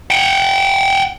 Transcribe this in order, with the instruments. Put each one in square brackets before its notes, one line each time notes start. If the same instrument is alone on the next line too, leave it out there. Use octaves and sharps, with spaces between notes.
[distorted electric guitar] F#5 G5